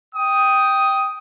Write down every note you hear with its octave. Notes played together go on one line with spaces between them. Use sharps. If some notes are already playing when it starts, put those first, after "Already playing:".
G5 D#6